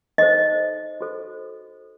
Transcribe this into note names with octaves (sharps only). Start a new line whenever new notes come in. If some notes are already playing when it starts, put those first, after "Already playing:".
D#4 A4 C5 D#5
F#4 A4 C5